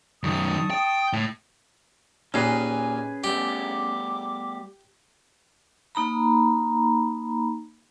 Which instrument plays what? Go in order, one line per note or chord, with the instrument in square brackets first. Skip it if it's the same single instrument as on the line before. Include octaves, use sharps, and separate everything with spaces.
[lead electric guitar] F#2 D#3 [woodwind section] A5 C#6 D#6
[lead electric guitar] G5
A2
[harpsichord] D#2 A#2 [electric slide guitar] C#4 G#4 B4 [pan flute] G#5
[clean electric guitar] G3 A3 B3 [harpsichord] G4 [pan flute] D6
[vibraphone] A#3 D#4 A#5 B5